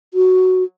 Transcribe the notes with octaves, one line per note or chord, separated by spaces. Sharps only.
F#4